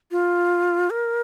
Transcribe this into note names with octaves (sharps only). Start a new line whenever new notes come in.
F4
A#4